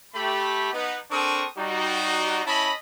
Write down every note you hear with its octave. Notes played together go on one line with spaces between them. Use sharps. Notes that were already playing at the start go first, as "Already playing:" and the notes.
A3 G4 B5
B3 D#4
C4 D4 A4 A#4 C#6 D#6
G3 D#4 F#4
C#4 E4 D#5 A5 B5